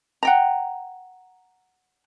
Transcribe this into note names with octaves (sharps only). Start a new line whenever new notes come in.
F#5 G5 A#5